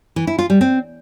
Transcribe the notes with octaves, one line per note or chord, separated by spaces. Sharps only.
E3
E4
F4
G3
C4